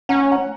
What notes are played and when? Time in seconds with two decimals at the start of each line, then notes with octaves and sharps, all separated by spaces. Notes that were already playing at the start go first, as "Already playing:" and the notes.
0.09 C#4 F#5 A#5
0.31 F#5 A#5